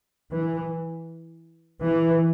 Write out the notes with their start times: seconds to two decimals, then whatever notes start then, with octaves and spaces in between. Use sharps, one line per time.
0.32 E3
1.84 E3